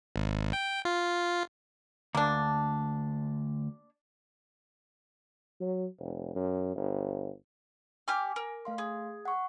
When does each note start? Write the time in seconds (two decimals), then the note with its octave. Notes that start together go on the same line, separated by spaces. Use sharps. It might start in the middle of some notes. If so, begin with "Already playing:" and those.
0.16 G#1
0.53 G5
0.85 F4
2.15 D2 A#3 D4
5.61 F#3
5.99 F1
6.35 F#2
6.76 G1
8.08 G4 G#5 D6 F6
8.36 A#4
8.65 A3 F5 C6
8.78 G#4
9.25 F#5 C#6